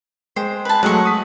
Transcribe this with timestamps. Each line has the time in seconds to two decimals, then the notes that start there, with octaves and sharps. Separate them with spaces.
0.36 G#3 C5 G5
0.65 B4 A5
0.83 F#3 G#3 A3 F#5 C#6
1.05 D#6 B6